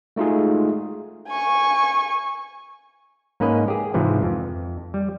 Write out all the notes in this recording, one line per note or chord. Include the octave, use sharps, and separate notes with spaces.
G#3 A3 D#4 F4 F#4 G#4
G#5 C#6
G#2 A#3 C#4 B4 D#5
G4 G#4
G#2 C3 E3 F3
F2
G3